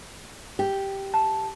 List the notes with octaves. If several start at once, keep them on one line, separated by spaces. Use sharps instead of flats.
G4
A5